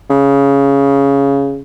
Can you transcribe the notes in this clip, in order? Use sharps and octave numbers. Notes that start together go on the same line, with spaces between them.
C#3